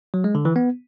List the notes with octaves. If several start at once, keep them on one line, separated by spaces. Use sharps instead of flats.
F#3
G#3
D3
E3
B3